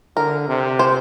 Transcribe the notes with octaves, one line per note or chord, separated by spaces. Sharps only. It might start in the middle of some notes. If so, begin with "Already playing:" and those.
D3 A#4
C3
C5